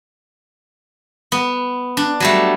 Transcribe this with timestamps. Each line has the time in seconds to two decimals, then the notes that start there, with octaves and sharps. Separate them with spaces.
1.32 B3
1.97 D4
2.20 F#3 G3 A3